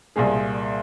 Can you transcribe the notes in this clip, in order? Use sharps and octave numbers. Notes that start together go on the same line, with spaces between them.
C2 A#2 G#3 G#4